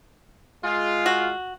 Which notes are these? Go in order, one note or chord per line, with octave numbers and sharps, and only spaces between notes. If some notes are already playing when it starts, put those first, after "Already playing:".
G#3 F4
F#4